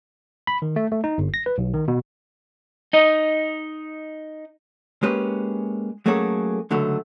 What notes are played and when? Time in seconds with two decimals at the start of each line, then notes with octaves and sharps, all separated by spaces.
0.47 B5
0.62 D#3
0.76 A3
0.92 A3
1.04 D#4
1.18 G1
1.34 A#6
1.46 B4
1.58 B1
1.74 D#3
1.88 B2
2.93 D#4 D#5
5.03 G#3 A#3 C#4 G4 B4
6.06 F#3 A3 A#3 C#4 G#4 A4
6.71 C#2 D3 F#3 A3